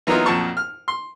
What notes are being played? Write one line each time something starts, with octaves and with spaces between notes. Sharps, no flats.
E3 F#3 A#3 B3 D#4 F4
B1 F2 A#2 F3 A5 C#6
F6
C6